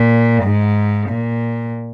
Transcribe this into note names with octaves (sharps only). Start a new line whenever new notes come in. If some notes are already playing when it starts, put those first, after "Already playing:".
Already playing: A#2
G#2
A#2